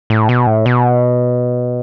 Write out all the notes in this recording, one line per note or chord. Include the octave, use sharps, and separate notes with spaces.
A2
B2
A2
B2